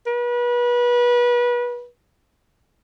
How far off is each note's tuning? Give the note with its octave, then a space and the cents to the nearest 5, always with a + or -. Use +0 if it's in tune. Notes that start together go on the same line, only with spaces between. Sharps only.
B4 -30